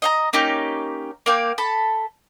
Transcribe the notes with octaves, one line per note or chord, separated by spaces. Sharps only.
D#5 F5 A#5
A#3 C#4 D#4 G4
A#3 F5 G5
A4 A5 B5